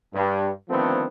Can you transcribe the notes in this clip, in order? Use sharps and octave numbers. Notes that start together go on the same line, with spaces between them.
G2
D3 D#3 F3 A3 B3 C4